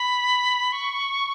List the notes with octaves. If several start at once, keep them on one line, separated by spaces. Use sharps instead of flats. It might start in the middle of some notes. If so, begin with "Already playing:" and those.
Already playing: B5
C#6